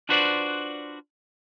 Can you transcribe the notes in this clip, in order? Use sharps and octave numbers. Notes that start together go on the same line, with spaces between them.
D4 F4 F#4 B4 C5 D5